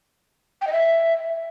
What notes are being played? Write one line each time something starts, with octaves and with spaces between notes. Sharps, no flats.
G5
D#5
E5